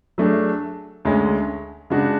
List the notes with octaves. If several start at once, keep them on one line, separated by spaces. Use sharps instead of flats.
F#3 A3 D4 G#4
D2 D3 G#3 C#4
C#3 G#3 D4 F#4